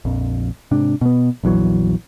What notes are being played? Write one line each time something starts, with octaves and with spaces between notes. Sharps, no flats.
A#1 F2
G#2 C3 D4
B2 B3
A#1 E2 E3 F#3